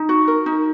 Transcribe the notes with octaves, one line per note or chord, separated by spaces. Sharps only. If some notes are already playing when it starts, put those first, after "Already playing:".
Already playing: D#4
F#4
A#4
D#4